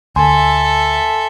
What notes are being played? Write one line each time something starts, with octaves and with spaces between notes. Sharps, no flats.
D2 A4 E5 G#5 C6